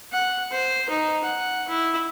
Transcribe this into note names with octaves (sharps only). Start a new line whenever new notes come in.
F#5
C5
D#4
F#5
E4